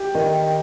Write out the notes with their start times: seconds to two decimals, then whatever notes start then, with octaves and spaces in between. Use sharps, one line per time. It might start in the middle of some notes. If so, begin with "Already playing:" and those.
Already playing: G4
0.15 D#3 D#5